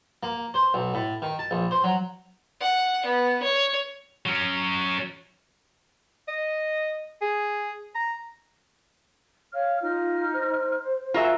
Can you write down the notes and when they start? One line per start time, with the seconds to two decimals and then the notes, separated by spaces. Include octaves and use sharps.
0.23 A#3
0.54 C5
0.74 B1
0.94 A2
1.22 D#3
1.39 A5
1.51 A#1
1.71 C5
1.84 F#3
2.60 F#5
3.05 B3
3.42 C#5
4.26 F#3 C#4
6.28 D#5
7.21 G#4
7.95 A#5
9.53 C#5 F5 F6
9.82 D#4 F4 F6
10.34 C5
11.14 F4 F#4 G#4 A#4 E5 C#6